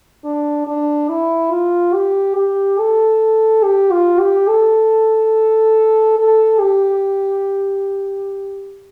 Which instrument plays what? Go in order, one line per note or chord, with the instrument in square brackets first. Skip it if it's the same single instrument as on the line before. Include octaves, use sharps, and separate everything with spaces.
[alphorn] D4
D4
E4
F4
G4
G4
A4
G4
F4
G4
A4
A4
G4